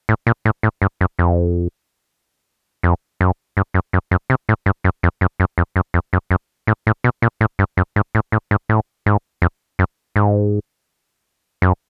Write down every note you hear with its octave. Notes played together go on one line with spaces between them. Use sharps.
A2
A#2
A2
A2
G2
F#2
F2
F2
F#2
G2
F#2
F#2
F#2
C3
A2
G2
F#2
F2
F#2
F#2
F2
F#2
F2
F#2
F#2
A2
A2
B2
A#2
A2
G2
F#2
G#2
A2
A2
G#2
A2
G#2
F2
F#2
G#2
F#2